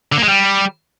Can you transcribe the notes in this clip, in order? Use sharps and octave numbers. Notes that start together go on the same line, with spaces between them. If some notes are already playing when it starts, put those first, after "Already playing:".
D3
A#3
G#3
G3